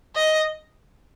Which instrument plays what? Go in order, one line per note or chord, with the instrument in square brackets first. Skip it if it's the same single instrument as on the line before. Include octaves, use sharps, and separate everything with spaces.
[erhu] D#5